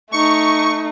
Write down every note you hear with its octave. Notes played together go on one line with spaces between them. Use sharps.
A3 D#4 C#6